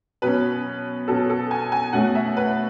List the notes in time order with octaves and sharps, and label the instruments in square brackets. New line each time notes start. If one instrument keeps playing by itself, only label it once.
[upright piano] B2 F#3 C#4 B4
B2 F#3 C#4 A4
A4
G#5
G#5
B2 A3 C#4 F#5
E5
B4